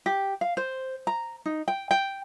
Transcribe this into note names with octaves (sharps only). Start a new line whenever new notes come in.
G4
F5
C5
A#5
D#4
G5
G5